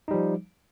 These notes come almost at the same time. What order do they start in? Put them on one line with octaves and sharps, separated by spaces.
D#4 G3 F3